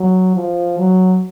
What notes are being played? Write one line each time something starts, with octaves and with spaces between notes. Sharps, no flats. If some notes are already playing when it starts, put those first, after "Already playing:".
Already playing: F#3
F3
F#3